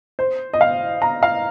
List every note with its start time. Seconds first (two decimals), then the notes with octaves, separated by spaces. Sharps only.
0.19 C5
0.53 D#5
0.61 F5
1.02 A#5
1.23 F5